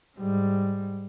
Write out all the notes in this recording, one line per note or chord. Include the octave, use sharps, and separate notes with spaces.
G#2 G3